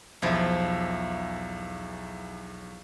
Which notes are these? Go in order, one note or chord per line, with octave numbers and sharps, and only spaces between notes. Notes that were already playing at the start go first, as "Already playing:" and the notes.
B1 E2 F3 E4 E5